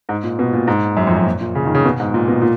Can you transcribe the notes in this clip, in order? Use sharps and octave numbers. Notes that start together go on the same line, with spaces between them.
G#2
A#2
B2
A#2
G#2
F#2
F2
F#2
A#2
A#2
C#3
D#3
C#3
B2
G#2
A#2
B2
A#2